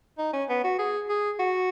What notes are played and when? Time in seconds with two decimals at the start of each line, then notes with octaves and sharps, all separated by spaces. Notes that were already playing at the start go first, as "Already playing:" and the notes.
0.18 D#4
0.33 C#4
0.49 B3
0.64 F#4
0.79 G#4
1.09 G#4
1.40 F#4